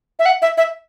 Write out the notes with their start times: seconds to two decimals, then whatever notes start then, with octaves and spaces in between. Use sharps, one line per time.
0.19 E5
0.26 F#5
0.42 E5
0.58 E5